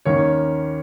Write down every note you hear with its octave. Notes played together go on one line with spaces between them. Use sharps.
D#2 D#3 A#3 C#4 C#5